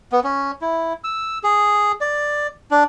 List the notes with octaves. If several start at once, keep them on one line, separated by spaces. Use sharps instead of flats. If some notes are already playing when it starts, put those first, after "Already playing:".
B3
C#4
E4
E6
G#4
D5
D4